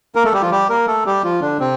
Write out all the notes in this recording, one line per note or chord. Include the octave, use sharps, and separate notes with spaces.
A#3 A#4
A3 A4
G3 G4
F3 F4
G3 G4
A#3 A#4
A3 A4
G3 G4
F3 F4
D3 D4
C3 C4